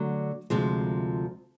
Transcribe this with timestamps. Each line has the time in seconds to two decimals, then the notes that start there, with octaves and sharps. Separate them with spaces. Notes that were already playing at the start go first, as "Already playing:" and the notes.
Already playing: D3 F#3 A3
0.50 D2 C3 F3 G#3